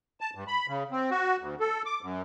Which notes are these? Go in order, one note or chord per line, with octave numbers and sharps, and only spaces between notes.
A5
G2
B5
C#3
C4
F#4
D2
A4
D6
F#2